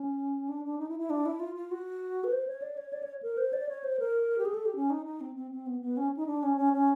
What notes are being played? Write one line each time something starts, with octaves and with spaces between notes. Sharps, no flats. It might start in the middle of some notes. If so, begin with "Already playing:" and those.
Already playing: C#4
D4
D4
D#4
E4
E4
D4
E4
F4
F4
F#4
B4
C5
C#5
D5
C#5
D5
C#5
A#4
C5
D5
C#5
C5
A#4
G4
G#4
A4
G4
C#4
D#4
D#4
C4
C4
C4
B3
B3
C#4
D#4
D4
C#4
C#4
C#4